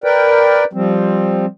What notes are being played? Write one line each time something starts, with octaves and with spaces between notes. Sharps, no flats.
A#4 B4 D5 G5
F3 G3 C4